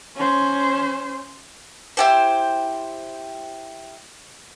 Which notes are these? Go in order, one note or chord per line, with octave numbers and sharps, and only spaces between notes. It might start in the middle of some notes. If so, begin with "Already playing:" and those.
C#4 C5
E4 G4 C5